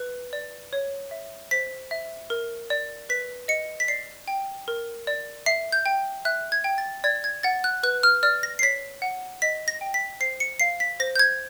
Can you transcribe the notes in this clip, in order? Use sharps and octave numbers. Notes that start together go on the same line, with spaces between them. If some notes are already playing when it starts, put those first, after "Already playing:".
Already playing: B4
D5
C#5
E5
C5 B6
E5
A#4
D5
B4 B6
D#5 C#7
B6
D5 C7
G5
A#4
D5
E5 C7
G6
G5
E5 F#6
G#6
G5
A6
D5 G#6
G#6
F#5 A6
F#6
B4 F#6
F6
D5 F6
A#6
C7
C#5 B6
F#5
D#5 B6
A#6
G5
B6
C5 C7
C#7
F5 C7
B6
C5 A#6
G6
G#6